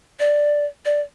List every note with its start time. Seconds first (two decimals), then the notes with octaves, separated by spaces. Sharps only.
0.20 D5
0.85 D5